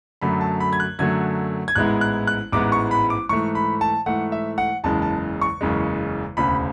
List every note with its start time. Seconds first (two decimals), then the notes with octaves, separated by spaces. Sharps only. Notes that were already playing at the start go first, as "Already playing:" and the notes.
0.21 F#2 D3 F#3 A3 B5
0.41 A5
0.60 B5
0.73 G#6
0.80 F#6
0.99 F#2 D3 F#3 A3 G#6
1.68 G#6
1.75 A1 G#2 G#3 B3 E4 F#6
2.01 F#6
2.27 F#6
2.52 A1 G#2 G#3 B3 E4 D6
2.72 C#6
2.91 B5
3.10 D6
3.29 G#2 E3 A3 C#6
3.55 B5
3.81 A5
4.06 G#2 E3 A3 F#5
4.32 E5
4.58 F#5
4.84 F#1 E2 C#3 G#3 A5
5.02 A5
5.41 C#6
5.61 F#1 E2 C#3 G#3
6.37 E1 D2 C#3 B5